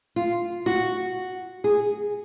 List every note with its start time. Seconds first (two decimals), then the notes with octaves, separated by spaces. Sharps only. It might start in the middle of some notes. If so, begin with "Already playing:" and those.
0.16 F4
0.66 F#4
1.64 G#4